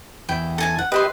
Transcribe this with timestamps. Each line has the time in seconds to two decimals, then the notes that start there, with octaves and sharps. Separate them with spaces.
0.29 E2 E4 G5
0.58 A4 G#5 A5
0.79 F#5
0.92 G4 B4 D#5 E5 C6